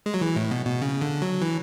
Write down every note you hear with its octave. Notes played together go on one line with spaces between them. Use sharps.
G#3
F#3
E3
A2
B2
B2
C#3
D3
F#3
E3